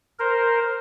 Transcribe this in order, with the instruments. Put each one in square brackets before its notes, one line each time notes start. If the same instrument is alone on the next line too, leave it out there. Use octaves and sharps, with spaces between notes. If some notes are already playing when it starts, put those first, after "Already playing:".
[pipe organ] A#4 C5